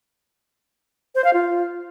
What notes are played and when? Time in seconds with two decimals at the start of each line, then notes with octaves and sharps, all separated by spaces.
1.15 C5
1.24 F5
1.33 F4